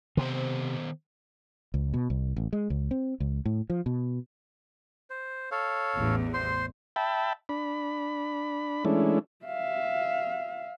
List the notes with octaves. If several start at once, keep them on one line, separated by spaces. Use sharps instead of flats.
C3 D#3 B3 C5
C#2
B2
C2
A1
G#3
C#2
C4
C#2
A2
F3
B2
C5
A4 C#5 F5
A1 E2
C5 C6
E5 G5 A5 B5
D4 B5
E3 G#3 A3 C#4 D4 E4
E5 F5